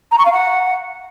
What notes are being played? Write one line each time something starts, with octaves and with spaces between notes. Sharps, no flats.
A#5
C#6
F5
F#5